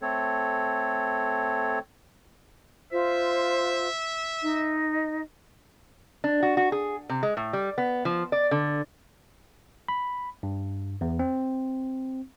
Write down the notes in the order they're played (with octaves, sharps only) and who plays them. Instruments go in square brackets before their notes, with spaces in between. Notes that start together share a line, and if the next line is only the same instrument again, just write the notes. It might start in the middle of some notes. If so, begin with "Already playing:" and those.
[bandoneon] A3 C4 A4 C#5
[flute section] F4 C5 [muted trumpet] E5
[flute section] D#4 D#5
[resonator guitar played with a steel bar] D4
F#4
F#4
G#4
C3
G#3
A2
G3
B3
F3
D5
D3
[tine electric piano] B5
G2
E2
C4